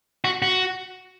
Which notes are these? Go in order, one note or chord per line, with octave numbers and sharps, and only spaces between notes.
F#4
F#4